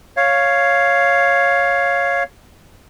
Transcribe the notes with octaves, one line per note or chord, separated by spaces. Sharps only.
C#5 F5